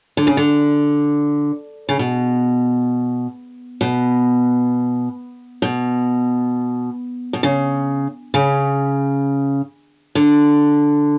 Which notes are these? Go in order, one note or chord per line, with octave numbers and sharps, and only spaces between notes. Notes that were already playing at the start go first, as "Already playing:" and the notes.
D3
C#3
D3
C#3
B2
B2
B2
B2
C#3
C#3
D3